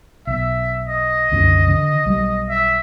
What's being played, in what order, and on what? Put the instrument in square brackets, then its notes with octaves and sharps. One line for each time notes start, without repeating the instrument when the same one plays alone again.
[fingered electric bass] B1 [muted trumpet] E5
[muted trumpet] D#5
[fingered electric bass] C2 F#2 D3
D3
B1 G3
[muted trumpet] E5